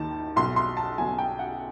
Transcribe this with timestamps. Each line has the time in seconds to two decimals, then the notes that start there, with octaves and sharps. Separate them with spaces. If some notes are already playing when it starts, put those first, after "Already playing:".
Already playing: D#2 D#3 A5
0.36 B1 B2 C6
0.56 C6
0.77 A5
0.98 B1 B2 G#5
1.18 G5
1.39 F#5